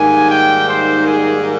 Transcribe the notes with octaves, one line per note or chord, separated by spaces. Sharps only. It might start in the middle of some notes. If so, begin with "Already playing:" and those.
Already playing: G#2 D#3 G3 A#3 G#5
G5
C5
G#4